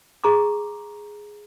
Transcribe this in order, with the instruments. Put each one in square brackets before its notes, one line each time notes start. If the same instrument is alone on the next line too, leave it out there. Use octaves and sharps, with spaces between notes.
[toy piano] G#4 A#5 C#6 D6